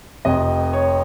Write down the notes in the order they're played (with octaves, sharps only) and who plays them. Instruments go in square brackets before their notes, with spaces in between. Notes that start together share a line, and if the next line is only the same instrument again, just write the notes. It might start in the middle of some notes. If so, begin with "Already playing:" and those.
[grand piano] F1 F2 C3 D#5
C#5